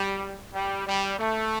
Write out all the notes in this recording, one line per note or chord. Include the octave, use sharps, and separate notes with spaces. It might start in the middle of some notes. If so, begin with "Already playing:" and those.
Already playing: G3
G3
G3
A3